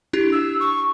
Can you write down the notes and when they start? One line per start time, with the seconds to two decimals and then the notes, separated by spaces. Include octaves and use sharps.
0.13 D4 E4 G4
0.32 E6
0.60 C#6